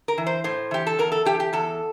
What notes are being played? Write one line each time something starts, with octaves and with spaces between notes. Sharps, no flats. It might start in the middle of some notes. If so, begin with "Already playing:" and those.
A#4
E3
C5
A2 C5
E3 G4
A4
E2 A#4
A4
E3 G4
G4
E2 A4